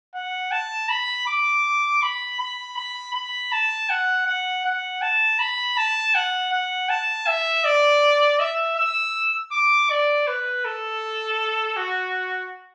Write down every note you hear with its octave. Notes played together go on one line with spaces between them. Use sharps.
F#5
A5
B5
D6
B5
B5
B5
B5
A5
F#5
F#5
F#5
A5
B5
A5
F#5
F#5
A5
E5
D5
E5
E6
D6
D5
B4
A4
F#4